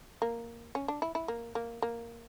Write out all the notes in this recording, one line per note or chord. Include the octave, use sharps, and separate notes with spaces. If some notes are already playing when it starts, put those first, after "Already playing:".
A#3
C#4
D4
E4
E4
A#3
A#3
A#3